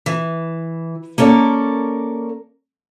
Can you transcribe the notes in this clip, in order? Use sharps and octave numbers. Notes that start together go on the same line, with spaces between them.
E3
A#3 C#4 A4 A#4 D5